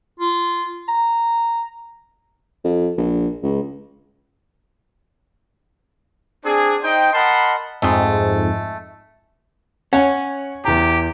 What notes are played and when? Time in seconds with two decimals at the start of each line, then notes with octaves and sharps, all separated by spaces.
0.20 F4
0.88 A#5
2.64 F2
2.97 A#1
3.43 C#2
6.45 C4 D4 G#4
6.83 D#4 C5 D#5 G5
7.13 A#4 D#5 F#5 A5 B5 C6
7.82 F2 G#2 G#3 A3
9.93 C#4 C#5 F#5
10.65 E2 G4 A#5